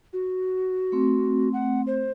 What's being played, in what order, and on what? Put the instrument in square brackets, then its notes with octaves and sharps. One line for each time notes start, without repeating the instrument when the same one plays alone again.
[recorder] F#4
[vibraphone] A3 C4
[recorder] F#5
C5